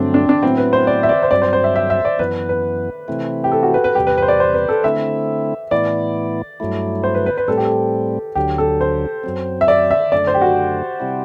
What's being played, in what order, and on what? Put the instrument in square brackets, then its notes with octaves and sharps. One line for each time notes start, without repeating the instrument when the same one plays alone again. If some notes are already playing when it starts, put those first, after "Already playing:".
Already playing: [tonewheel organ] G2 D3 F#3 A3 [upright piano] C4 D4
[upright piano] D4
D4
[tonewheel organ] A2 F#3 B3 E4 [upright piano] C4
[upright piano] B4
C5
D5
E5
D5
C5
[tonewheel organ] G2 F#3 C4 [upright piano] D5
[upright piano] C5
C5
E5
E5
E5
D5
[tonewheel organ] F#2 E3 B3 [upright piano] B4
[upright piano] B4
[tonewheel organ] C3 E3 A3 C4 E4
[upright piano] G4
A4
F#4
B4
B4
[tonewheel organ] E2 C3 G3 [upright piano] G4
[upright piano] B4
B4 C5
D5
C5
B4
A4
[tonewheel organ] D3 A3 C4 E4 [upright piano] E5
[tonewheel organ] A2 E3 B3 E4 [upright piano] D5
[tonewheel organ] G2 F#3 A3 E4
[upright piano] C5
B4
B4
B4
[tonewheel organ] A2 G3 C4 [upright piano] A4
[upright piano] G4
A4
[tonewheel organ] D2 D3 F#3 [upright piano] G4
[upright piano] A4
C5
[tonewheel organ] F#2 F#3 C4
[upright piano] E5
D5
E5
[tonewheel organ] F#2 D3 A3 [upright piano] D5
[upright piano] C5
G4
F#4
[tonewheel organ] C3 G3 C4 E4